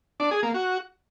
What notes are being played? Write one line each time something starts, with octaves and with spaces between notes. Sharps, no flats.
D4
G#4
A#3
F#4